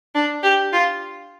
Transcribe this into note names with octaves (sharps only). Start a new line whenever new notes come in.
D4
G4
F4